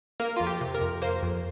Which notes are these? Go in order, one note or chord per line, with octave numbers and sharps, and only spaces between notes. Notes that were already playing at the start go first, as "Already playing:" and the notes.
A#3 A#4
F2 F4
G4
C3
A#4
F2
A#3 C5
F2